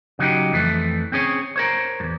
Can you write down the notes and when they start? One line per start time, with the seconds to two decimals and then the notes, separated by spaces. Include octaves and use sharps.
0.19 C#3 F#3 D#4 G4
0.53 F2 E3 A3
1.12 C4 C#4 G#4 C#5
1.56 A#4 C5 C#5
2.00 E2 G2